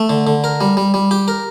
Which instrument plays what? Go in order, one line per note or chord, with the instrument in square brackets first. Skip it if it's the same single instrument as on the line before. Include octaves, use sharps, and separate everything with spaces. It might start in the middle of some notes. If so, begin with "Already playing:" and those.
Already playing: [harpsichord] A3
D3
D3
A#4
G3
G3
G3
G4
A#4